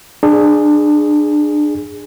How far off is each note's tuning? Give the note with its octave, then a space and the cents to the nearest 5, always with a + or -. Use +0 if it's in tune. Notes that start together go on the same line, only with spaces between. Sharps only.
D4 +25 G#4 +0